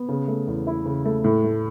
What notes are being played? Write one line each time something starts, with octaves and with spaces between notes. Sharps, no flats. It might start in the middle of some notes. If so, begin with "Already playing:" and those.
Already playing: B3
C#3
A3
E2
E4
C#3
A3
A2
A3